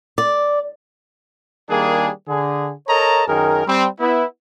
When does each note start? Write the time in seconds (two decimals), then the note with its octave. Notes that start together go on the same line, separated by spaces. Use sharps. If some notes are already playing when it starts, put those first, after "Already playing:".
0.18 D5
1.70 D#3 G3 A#3 D4 G#4
2.28 D3 G#4
2.88 A4 A#4 C#5 D#5 A5 A#5
3.28 F#2 D#3 G#4 A#4
3.67 G3 C4
4.00 B3 E4